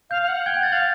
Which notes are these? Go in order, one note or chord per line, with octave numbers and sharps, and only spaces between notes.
F5 G6
F5
F#5
G5 G#6
G6
F#5 A6
F5 A6